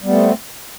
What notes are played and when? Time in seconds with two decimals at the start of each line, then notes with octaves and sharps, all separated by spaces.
0.02 G3
0.05 B3
0.09 A3
0.12 C4